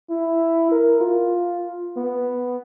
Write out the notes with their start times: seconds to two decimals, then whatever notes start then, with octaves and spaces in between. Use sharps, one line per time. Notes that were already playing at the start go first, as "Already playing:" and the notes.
0.10 E4
0.72 A#4
1.01 F4
1.97 B3